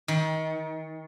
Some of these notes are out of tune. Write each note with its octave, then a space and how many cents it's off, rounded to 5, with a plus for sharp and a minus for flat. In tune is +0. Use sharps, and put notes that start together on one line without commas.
D#3 +30